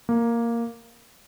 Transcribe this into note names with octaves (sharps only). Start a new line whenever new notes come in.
A#3